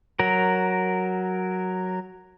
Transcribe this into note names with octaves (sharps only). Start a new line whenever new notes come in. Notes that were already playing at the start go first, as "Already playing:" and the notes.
F#3 A#4